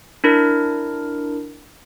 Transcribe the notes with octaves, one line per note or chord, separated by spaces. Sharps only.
D4 E4 A#4